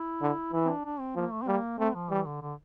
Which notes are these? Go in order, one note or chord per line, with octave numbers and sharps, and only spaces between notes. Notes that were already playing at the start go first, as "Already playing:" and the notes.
Already playing: E4
D3
E3 E4
C4
D4
D4
C4
F3 A#3
A3
C4
G3 A#3
A3 C4
F3
E3 G3
D3
D3